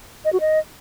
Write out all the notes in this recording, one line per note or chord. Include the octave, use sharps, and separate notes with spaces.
D#5
F#4
D#5